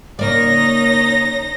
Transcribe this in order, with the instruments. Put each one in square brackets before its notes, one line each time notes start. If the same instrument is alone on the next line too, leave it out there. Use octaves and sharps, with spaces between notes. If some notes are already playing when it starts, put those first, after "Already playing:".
[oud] C#3 A#3 D5 [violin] D#4 A#6 [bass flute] C#5